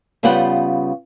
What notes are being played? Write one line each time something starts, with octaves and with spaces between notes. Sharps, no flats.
C#3 G3 B3 F4 F#5 G5